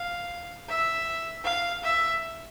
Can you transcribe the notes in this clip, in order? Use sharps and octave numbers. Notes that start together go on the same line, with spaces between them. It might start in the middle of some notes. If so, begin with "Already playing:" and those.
Already playing: F5
E5
F5
E5